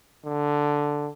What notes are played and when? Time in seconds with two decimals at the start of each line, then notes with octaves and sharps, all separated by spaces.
0.24 D3